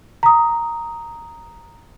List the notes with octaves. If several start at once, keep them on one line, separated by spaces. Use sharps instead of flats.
A#5 D#6